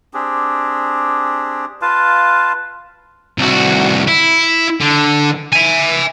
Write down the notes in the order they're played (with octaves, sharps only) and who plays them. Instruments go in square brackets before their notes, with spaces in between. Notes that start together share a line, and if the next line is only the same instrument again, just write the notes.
[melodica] C4 D4 G4 G#4
F4 B4 F5 A5
[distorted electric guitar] C2 F#4
E4
D3
E5 G#5